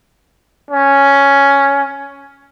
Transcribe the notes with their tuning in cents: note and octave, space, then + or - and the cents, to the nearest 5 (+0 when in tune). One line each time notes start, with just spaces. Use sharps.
C#4 +5